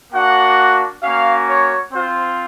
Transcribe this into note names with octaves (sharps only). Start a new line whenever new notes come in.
A#3 D4 F#4 F#5
A#3 C#4 F#4 F5
C#5
C4 F4 C5